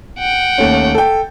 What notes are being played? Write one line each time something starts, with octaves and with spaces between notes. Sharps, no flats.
F#5 G5
D#2 A3 C#4
A4 G5